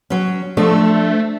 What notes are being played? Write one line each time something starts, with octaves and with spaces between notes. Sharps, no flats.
F#3 C#4
F3 A3 D4 A4